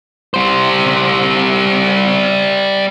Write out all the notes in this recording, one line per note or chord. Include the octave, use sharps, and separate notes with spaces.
G3 C5